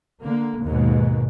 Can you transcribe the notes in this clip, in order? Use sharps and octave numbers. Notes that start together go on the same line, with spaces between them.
D3 A#3
D#2 G#2 B2